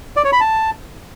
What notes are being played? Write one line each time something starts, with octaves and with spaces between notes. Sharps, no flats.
D5
C#5
B5
A5